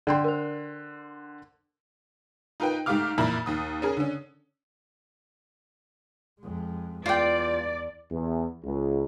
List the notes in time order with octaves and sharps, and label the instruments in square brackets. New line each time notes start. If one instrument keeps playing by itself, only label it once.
[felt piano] D3 G5 C6 [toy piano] D5
[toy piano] A#4 C5
[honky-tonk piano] D#4 F4 A#4 B4 G5
G#2 A3 G4 F5 D6 F6
F2 A#2 E3 E4 A#5 B5
D#2 D#6
C#4 G#4 A#4
D3 C#4
[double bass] F2 G#3
[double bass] E2 [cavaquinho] F4 G5 [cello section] D5
[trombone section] E2
C#2